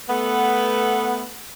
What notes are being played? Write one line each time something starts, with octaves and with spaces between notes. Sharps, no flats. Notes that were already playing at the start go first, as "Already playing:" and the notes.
A3 B3